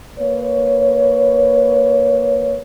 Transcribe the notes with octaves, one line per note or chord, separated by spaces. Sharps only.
A#3 B4 C#5